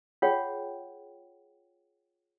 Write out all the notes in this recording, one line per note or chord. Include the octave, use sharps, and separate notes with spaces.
F4 G#4 C#5 F#5 G5